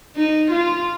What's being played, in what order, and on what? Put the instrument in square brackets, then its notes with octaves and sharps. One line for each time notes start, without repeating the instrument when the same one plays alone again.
[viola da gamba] D#4
F4